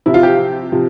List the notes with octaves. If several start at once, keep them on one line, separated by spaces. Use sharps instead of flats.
C3 F3 E4
F4
G4
C3 F3